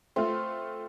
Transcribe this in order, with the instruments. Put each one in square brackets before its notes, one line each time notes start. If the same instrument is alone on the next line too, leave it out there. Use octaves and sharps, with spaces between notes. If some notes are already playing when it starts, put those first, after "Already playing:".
[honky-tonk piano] A3 F4 [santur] C4